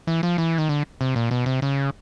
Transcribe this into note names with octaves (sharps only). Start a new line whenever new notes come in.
E3
F3
E3
D#3
D3
C3
A#2
B2
C3
C#3